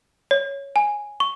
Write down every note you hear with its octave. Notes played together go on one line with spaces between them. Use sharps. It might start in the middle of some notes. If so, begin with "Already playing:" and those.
C#5
G#5
C#6